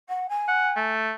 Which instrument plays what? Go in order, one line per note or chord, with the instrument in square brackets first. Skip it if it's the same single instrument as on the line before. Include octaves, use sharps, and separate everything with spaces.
[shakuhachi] F#5
G#5
[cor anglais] F#5
A3